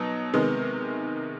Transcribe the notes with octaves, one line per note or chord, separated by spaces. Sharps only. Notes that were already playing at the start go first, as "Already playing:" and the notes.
Already playing: B2 F#3 B3 D#4
C3 D#3 G#3 B3